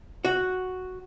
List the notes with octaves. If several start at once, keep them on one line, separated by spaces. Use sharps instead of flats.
F#4